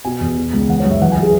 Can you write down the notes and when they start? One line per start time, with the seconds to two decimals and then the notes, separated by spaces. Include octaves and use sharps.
0.05 B2 G#5
0.21 E2
0.37 B2
0.53 C#2
0.68 E3 F#5
0.80 C#5
0.85 F#2
0.91 E5
1.02 E3 F#5
1.12 G#5
1.17 E3
1.23 G#4